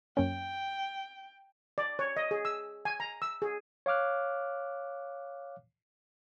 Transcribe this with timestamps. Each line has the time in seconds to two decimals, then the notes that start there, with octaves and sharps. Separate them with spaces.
0.17 F#2 A#3 C#4 G5
1.78 D5
1.99 C#5
2.17 D#5
2.31 G#4
2.45 E6
2.85 G#5
3.00 A#5
3.22 E6
3.42 G#4
3.86 C#5 F5 D6 F6 F#6